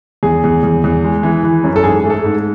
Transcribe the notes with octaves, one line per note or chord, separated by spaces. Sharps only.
E2 G#4
E2
E2
E2
G#3
E3
E3
F#2
A4
G#2 G#4
A3 G#4
A4
G#2